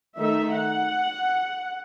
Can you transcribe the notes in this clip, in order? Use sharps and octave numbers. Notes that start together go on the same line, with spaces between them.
D#3 A3 D#4 E5
F#5